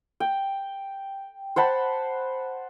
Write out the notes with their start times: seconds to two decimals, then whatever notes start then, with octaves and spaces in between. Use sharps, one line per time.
0.20 G5
1.56 C5 F#5 A5 B5